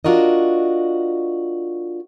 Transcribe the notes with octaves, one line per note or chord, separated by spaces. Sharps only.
D4 F4 F#4 A#4 D#5